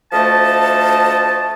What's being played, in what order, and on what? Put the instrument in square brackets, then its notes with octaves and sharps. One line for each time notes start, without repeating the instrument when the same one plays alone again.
[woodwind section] D2 F3 A3 D#5 A5